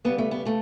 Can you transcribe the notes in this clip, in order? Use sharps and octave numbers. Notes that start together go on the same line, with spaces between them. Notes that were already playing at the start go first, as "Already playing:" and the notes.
C#3 G3 B3
A3
B3
C#3 A3